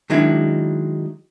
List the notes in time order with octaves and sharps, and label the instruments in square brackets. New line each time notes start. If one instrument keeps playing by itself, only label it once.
[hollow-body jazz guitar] D#3 F#3 G#3 D4 E4